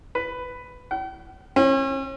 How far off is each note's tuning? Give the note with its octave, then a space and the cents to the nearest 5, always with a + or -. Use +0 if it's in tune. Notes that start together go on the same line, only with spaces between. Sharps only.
B4 +10
G5 -45
C#4 -40